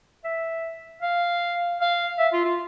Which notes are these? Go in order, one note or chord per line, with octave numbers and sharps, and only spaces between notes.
E5
F5
F5
E5
F4
F4